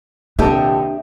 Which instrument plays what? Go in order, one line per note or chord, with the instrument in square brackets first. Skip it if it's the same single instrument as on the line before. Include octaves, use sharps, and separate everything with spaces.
[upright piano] D#1 C2 A4 [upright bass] D4 [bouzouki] G4 D#5 E5